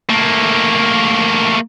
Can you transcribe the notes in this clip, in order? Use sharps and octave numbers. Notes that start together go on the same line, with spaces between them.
A3 A#3